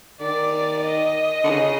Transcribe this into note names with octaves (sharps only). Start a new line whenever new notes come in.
D#3 D5
D#5
D3
C#3